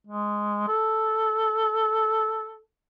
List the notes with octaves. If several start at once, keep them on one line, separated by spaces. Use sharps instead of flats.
G#3
A4